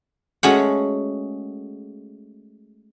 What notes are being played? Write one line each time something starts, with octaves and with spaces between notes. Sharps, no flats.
G#3 A3 C#4 F#4 G#4 F#5